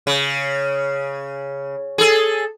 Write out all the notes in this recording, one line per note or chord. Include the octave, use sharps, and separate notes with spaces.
C#3
G#4 A4